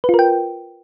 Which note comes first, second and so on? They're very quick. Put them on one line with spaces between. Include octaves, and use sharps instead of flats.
B4 F4 A#4 G5